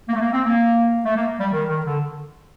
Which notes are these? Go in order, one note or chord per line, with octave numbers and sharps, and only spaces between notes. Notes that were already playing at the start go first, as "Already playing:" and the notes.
A#3
A3
A#3
C4
A#3
A3
A#3
G3
D#3
D#3
D3